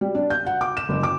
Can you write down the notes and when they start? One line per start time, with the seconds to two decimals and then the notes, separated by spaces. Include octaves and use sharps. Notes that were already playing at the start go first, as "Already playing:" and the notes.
0.01 G3
0.15 D4
0.30 G6
0.46 F#5
0.61 D6
0.77 E7
0.89 F#1
1.03 D6